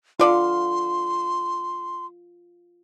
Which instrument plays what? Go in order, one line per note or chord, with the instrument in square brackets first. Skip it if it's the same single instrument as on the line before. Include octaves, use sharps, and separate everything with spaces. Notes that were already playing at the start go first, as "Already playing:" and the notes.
[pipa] D3 D5 F5 [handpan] F4 [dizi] C6